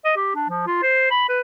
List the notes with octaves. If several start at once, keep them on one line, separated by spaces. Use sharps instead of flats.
D#5
G4
D4
F3
F4
C5
B5
B4